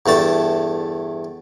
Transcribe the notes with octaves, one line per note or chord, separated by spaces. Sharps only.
E2 G2 A3 A5